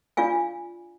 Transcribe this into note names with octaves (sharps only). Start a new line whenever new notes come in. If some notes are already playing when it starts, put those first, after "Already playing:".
D4 F4 D5 F5 G#5